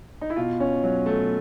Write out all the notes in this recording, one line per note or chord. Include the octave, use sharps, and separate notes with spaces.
D#4
E4
B2 F4
C#4
F#3
A3